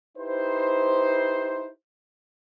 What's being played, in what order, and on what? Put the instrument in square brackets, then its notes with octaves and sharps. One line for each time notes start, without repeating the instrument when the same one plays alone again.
[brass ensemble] D#4 E4 G4 B4 C5